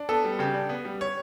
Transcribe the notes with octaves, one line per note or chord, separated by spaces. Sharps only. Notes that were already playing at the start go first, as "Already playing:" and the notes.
Already playing: D4
B3 A4
G3
C#3 G4
D4
B3
G3
C#5